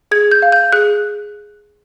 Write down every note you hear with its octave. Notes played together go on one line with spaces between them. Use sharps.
G#4 G#6
G6
F5
G6
G#4 F#6